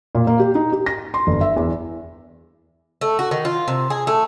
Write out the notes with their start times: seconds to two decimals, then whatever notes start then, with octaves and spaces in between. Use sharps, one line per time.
0.15 A#2
0.27 A#3
0.39 G4
0.55 D#4
0.72 G4
0.86 A#6
1.14 C6
1.27 G1
1.41 E5
1.56 E2
3.01 A3
3.19 F#4
3.31 D#3
3.45 F4
3.68 C3
3.90 G#4
4.07 A3